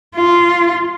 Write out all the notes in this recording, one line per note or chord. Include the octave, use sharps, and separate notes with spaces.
F4